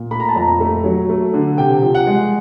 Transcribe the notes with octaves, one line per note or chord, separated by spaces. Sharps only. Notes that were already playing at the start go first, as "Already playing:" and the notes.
Already playing: A#2
A3 B5
A#5
A5
F2 A#5
A3
F#3
A3
D3
C3 G5
F3
F#5
G#3